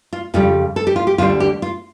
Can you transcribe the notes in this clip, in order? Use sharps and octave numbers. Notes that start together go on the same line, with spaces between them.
F4
F2 C#3 G3 F4
A4
G4
F4
G4
D2 D3 G3 D4 F4
G4
F4